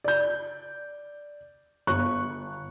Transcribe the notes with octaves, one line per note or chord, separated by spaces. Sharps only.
D5 G6
G1 C#6 F#6